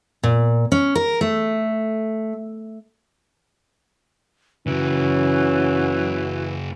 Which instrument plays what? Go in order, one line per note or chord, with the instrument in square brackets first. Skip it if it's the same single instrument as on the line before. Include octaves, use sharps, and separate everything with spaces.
[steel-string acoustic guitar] A#2
C#4
A#4
A3
[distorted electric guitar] F#2 C#3 [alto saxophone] E3 [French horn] C#4 [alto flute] F#4